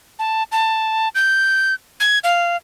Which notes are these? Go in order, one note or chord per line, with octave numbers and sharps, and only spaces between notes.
A5
A5
G6
G#6
F5